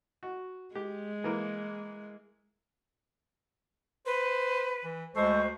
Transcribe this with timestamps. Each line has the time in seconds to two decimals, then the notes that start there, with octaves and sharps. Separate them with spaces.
0.23 F#4
0.75 G#3 G4
1.24 E3 A#3
4.06 B4 C5
4.84 E3
5.15 D2 G#3 A4 C5 C#6